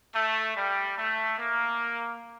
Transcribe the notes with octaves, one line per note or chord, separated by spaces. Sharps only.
A3
G3
A3
A#3